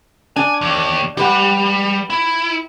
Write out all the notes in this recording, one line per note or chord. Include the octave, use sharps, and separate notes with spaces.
D4 G#5
D#2
G3 G4 B4 F#5
E4